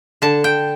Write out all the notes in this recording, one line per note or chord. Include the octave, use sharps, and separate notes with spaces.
D3 A5
G5